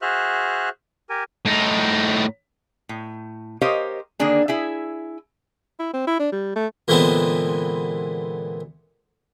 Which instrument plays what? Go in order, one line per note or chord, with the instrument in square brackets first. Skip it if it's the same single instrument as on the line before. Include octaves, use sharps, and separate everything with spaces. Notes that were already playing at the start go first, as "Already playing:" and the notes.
[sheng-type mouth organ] F#4 G#4 C5 E5 F6 F#6
G4 A#4 G#5
[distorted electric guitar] A2 D#4
[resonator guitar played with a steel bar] A2
G4 A#4 C5 C#5 D#5 F5
D3 D#3 A#3 D4 G#4
E4 G#4 E5
[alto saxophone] E4
C4
E4
D4
G3
A3
[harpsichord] A#2 D3 E3 G#3 B3 C4